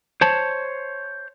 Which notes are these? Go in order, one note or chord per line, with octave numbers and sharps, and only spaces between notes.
C5 C#5 A5